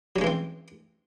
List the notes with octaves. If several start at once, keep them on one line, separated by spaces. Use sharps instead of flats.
E3 F#3 G#3 C4 C#4